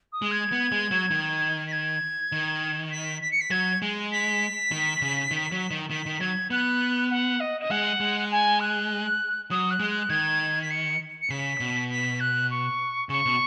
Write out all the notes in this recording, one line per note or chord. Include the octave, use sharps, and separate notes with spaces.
D#6
G#3
G#6
B3
G#3
F#3
D#3
B6
G#6
D#3
B6
B6
C#7
B6
F#3 G#6
G#3
B6
D#3
C#3
D#3
F#3
D#3
D#3 B6
D#3
F#3 G#6
B3 F#6
F#5
D#5
D#5
G#3 F#5
G#3
G#5
F#6
F#3 D#6
F#6
G#3
F#6
D#3 G#6
B6
C#7
C#7
C#3 B6
B2
B6
F#6
C#6
C#3 C#6
B2